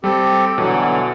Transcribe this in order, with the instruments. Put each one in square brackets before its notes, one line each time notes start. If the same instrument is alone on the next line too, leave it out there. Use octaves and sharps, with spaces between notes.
[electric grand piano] G3 [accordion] C4 G4 A4
[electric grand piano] B2 [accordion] D3 E3 F#3